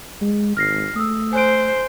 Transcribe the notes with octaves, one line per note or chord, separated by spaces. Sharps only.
G#3
G#1 F6 A#6 C7
A3 D#6 E6
C5 G#5 F#6 D7